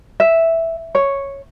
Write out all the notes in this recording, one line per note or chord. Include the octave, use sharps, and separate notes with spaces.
E5
C#5